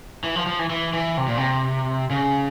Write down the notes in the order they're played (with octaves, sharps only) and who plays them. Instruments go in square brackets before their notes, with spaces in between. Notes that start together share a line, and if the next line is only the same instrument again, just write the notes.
[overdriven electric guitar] E3
F3
F3
E3
E3
E3
C3
A#2
C3
C#3